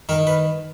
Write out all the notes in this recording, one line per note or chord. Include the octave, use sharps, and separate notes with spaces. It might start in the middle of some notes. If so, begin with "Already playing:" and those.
D#3 A#4
B4